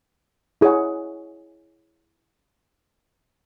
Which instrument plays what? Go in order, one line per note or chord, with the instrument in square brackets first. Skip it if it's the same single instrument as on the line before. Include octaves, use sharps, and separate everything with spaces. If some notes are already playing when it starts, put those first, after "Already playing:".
[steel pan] E4 G#4 C#5 F#5